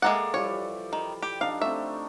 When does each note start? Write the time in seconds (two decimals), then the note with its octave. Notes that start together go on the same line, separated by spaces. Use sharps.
0.02 G#3 A#3 A4 D5 E5 F#5
0.34 E3 F3 G3 C#5
0.93 D#3
1.23 G4
1.41 F3 D4 D#4 F5
1.61 A3 C4 E5